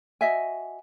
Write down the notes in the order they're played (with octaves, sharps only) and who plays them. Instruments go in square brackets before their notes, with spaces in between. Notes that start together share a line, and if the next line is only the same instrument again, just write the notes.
[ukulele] F#4 D#5 E5 G#5